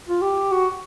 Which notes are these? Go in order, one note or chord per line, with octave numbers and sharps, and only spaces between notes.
F4
G4
F#4